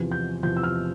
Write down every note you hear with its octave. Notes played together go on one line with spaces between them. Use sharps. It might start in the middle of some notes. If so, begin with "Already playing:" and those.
Already playing: E2 C3 F3
G6
E2 C3 F3 G6
E6
F6